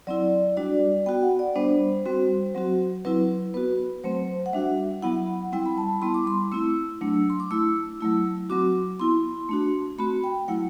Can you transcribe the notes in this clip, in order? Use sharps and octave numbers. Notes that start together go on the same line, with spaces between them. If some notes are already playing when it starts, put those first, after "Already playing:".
F#3 C4 E4 D5
G3 D4 F#4 D5
B3 F#4 G5
F#5
D5
G3 B3 D4 C5
G3 C4 F#4
F#3 C4 F#4
F#3 C4 E4 B4
B3 F#4 B4
F#3 A3 C4 C5
F#5
G3 D4 F#4 E5
F#3 B3 E4 F#5
G3 C4 E4 G5
B5
A5
G3 B3 E4 C6
D6
C6
A3 C4 E4 E6
F#3 A3 D4
C6
D6
A3 E4 E6
F#3 A3 E4
F#3 C4 F#4 D6
B3 E4 C6
A3 D4 F#4
A3 C4 F#4 B5
G5
F#3 A3 E4 F#5